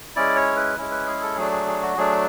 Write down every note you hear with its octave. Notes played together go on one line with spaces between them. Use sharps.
G#3 C#4 E4 D5
C#5
B4
G#3 C#4 E4
B4
G#4
A4
F#3 A3 D4 G#4
G#4
G#4
F#4
F#3 A3 D4 G#4